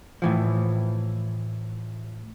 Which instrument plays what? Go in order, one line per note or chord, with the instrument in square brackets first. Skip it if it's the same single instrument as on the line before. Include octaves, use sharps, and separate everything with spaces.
[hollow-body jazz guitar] A2 E3 F3